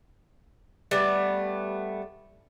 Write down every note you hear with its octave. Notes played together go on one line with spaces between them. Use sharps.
G3 A3 B3